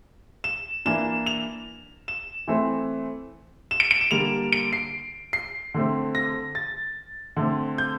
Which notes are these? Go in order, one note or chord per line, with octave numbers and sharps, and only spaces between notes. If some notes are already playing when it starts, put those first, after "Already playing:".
E7
E3 A#3 D4 E7
F7
E7
E3 A3 C4
E7
D7
D7
E7
D3 G3 A#3 F7
D7
C7
C7
D3 A3 C4
A#6
A6
D3 A3 C4
G6